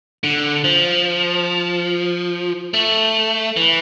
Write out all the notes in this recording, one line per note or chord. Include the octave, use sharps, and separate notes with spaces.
D3
F3
A3
E3